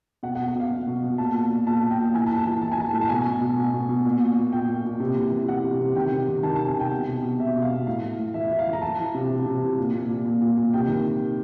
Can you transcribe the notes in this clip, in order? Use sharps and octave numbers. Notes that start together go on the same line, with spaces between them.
B2 F#5
F#5
B2
F#5
B2 F5
B2
B2
B2
A#2 A5
A#2
A#2
A#2 A5
A#2
G5
A#2
E3 G#5
A5
E3
A5
E3
E3 A5
G#5
E3 A5
A2
A5
B2 G#5
B2
B2
B2
B2
B2
A#2
A#2
A#2
A#2 G5
A#2
A#2
C3
E3
E3
E3 F#5
C3
C3
D#3 G5
C3
D#3
D#3 A5
A5
C3
G#5
C3 G5
B2 F#5
B2
B2
B2 E5
B2
F5
B2
A2 F5
E3
A2
E3 E5
E5
E3
F5
E3
A#5
E3 A5
E3
C3
C3
C3
E3
A#2
A#2
A#2
A#2
A#2
A#2
C3 G5
D#3